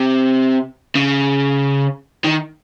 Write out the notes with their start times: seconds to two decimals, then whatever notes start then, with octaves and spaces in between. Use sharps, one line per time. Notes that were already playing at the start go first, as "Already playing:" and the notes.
Already playing: C3
0.95 C#3
2.24 D#3